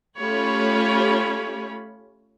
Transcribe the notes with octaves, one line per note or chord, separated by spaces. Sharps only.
A3 C#4 F4 G4 C#5 B5